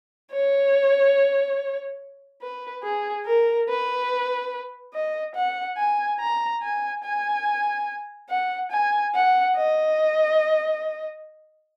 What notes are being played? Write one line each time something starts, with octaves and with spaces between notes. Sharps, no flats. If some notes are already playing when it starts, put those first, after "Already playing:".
C#5
B4
G#4
A#4
B4
D#5
F#5
G#5
A#5
G#5
G#5
F#5
G#5
F#5
D#5